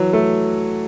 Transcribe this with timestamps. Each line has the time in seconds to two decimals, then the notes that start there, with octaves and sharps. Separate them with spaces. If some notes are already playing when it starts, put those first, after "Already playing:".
Already playing: E3 F#3
0.13 A3